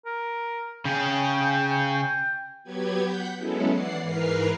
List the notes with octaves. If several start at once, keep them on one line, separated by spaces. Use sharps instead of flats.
A#4
C#3 G#4 G5
G5
F#3 B3 G4 B4 G#6
F#5 G6 B6
F#3 G#3 B3 C#4 E4 A4
E3 D5 F#5 C7
G#2 E3 A#4 B4 F6 C7